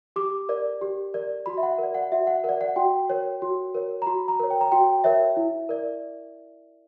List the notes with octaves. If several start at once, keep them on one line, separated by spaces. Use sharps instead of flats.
G4 D6
A#4 D5
G4
A#4 D5
F#4 B5
E5
F#5
A#4
D5
F#5
F#4 E5
F#5
A#4 D5 F#5
F#5
F#4 G5
A#4 C#5
F#4
A#4 C#5
A#5
F#4 B5
A#5
A#4 C#5
G5
A#5
F#4 G5
A#4 C#5 E5
E4
A#4 D5